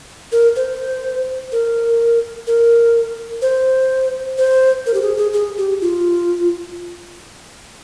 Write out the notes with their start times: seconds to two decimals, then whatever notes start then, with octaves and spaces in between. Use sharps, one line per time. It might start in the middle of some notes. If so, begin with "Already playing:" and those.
0.32 A#4
0.56 C5
1.52 A#4
2.47 A#4
3.42 C5
4.38 C5
4.86 A#4
4.94 G4
5.02 G#4
5.17 G#4
5.33 G#4
5.58 G4
5.81 F4